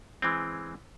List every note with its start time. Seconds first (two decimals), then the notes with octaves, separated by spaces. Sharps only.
0.22 E3 G#3 C4